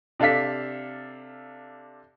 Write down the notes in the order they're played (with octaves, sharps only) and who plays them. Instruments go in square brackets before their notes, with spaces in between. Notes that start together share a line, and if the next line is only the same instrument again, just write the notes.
[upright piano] C3 D4 A4 F5 B6